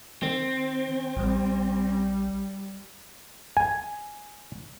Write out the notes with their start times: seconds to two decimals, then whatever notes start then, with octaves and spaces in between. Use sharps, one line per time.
0.22 D#3 C4
1.16 A#1 G3
3.57 G#5